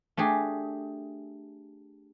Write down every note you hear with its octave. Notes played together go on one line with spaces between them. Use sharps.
A3 D4 G4 G#4